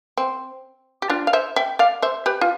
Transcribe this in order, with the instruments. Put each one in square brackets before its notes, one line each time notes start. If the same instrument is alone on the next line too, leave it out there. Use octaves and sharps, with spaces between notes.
[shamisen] C4
G4
D4 F4
F5
C5 E5
E5 G5
D5 F5
C5 E5
G4 B4
F4